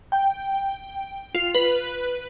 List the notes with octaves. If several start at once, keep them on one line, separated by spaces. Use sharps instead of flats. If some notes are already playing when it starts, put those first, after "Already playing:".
G5
F4
B4